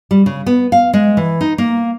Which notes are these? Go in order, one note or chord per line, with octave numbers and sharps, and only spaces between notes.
G3
C#3
B3
F5
G#3
E3
D#4
A#3